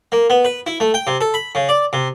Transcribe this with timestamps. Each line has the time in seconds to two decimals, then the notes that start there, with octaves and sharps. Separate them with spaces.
0.12 A#3
0.30 B3
0.45 B4
0.66 E4
0.80 A3
0.94 G5
1.07 C3
1.21 A4
1.34 B5
1.55 C#3
1.69 D5
1.93 C3